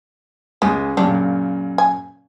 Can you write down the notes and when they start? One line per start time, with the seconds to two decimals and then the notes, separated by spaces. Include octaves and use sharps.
0.62 C#2 C#3 G#3
0.97 F#2 A#2 C#3 D4 G4
1.78 G#5